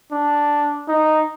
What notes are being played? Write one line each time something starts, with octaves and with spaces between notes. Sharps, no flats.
D4
D#4